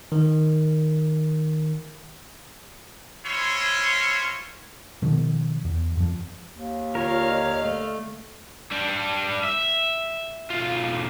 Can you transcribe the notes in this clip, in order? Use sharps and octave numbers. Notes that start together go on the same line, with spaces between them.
D#3 A#4
G#3 E4 F4 C5 C#5 C6
B2 D#3 F3
E2
F2 F3
D#2
D3 F4 A#4 C#5 F5 F6
D#5
A3
G3 D4
E5
B1 F4